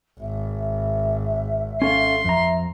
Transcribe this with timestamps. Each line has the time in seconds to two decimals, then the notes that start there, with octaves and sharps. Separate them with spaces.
0.20 G#1 E5
1.82 C#4 A4 F5 C6
2.25 F2 E5 A#5